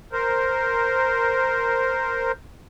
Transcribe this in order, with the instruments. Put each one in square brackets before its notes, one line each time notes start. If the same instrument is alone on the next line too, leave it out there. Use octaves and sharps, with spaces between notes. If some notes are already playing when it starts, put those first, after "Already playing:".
[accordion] A#4 C5